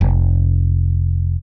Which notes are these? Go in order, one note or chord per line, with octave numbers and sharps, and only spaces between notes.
F1